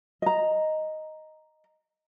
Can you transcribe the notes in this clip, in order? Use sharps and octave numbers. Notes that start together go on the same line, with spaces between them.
D#5 A#5